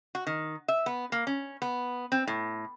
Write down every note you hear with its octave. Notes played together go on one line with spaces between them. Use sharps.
F#4
D#3
E5
B3
A#3
C#4
B3
C4
A2